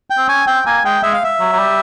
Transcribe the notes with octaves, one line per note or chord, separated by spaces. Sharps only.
G5
C4
C#4 G#5
C4 G5
A#3 G#5
G#3 G5
G#3 E5
F5
E5
F#3
F#3
G3